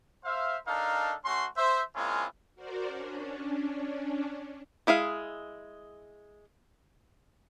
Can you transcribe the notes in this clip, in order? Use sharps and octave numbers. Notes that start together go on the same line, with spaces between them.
C5 E5 F5
D4 D#4 A4 A#4 F5
A3 C#4 F#4 C6
C5 E5
G#3 A#3 C4 C#4 E4 F4
F#4 A#4 C5 D5
C#4 D4
G#3 E4 G#4 F5